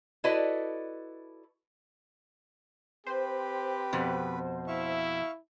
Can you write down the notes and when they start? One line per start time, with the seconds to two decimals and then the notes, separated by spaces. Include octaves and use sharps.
0.24 E4 F#4 A4 B4 D5 D#5
3.07 C4 G4 B4 C5 B5
3.93 F2 B2
4.67 E4 E5 F5 C#6